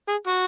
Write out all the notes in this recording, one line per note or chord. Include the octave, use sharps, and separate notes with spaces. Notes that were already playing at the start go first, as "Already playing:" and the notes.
G#4
F#4